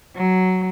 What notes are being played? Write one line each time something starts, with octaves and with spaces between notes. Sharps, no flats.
F#3